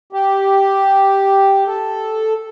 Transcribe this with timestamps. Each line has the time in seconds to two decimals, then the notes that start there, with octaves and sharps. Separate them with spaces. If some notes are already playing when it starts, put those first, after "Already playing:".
0.13 G4
1.67 A4